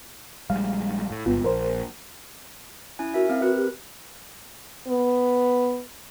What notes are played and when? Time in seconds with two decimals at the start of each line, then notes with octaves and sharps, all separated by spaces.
0.50 A#1 G3 G#3 F5
1.11 A2
1.26 G1 C#2 B3 F4
1.44 A#1 A#4 C5
2.99 C#4 E4 G#5
3.14 F#4 A#4 E5
3.29 C4 F5
3.42 F#4 A#4 B4
3.57 G4
4.88 B3